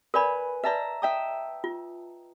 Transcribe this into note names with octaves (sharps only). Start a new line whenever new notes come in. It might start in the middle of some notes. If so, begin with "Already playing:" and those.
A#4 B4 D5 G#5 B5
B4 D5 E5 A5 A#5
E5 G5 D#6
F4